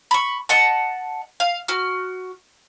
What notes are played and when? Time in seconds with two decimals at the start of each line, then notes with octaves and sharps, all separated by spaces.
0.11 B5 C#6
0.49 D#5 F#5 A5
1.40 F5
1.68 F#4 F6